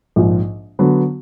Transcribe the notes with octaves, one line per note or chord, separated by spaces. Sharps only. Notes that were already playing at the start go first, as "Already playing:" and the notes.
A#1 G#2 F3
D3 F#3 B3